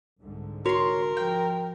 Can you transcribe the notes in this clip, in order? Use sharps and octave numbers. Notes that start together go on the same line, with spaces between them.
C2 G#2 D3
F#4 A#4 C#5 C6
F3 G5